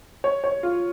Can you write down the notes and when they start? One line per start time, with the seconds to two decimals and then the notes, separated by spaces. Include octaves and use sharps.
0.24 C#5
0.44 C#5
0.63 F4